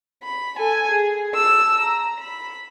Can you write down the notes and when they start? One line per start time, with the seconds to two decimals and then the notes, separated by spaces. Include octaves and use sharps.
0.23 B5
0.56 A4 G#5
0.92 G#4
1.31 A5 E6
1.80 A#5
2.20 B5